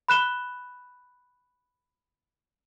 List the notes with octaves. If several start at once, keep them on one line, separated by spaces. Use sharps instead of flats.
B5 F#6 E7 G7